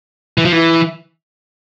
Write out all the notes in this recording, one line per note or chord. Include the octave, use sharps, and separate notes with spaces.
E3
F3
E3